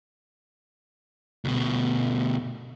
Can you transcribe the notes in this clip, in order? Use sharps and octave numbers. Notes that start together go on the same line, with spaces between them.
D2 B2